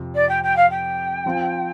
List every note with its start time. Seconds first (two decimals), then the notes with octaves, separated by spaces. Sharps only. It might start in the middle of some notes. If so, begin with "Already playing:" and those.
Already playing: F2 C3 F3
0.14 D5
0.29 G5
0.43 G5
0.56 F5
0.70 G5
1.26 F3 C4 F4